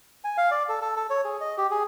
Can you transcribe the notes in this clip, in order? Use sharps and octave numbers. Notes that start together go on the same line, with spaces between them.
G#5
F5
D5
A4
A4
A4
C#5
G#4
D#5
G4
G#4